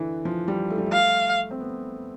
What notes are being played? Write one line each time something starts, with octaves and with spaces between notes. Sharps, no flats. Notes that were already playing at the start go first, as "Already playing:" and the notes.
Already playing: D3 E3
F3
G3
A3
G3
A3
F5
C4
B3